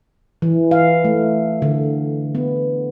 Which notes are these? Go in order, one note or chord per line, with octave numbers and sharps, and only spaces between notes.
E3
F5
A3
D3
B3